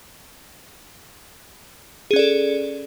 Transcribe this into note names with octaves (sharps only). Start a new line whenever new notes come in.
C#4 G#4 A4 D5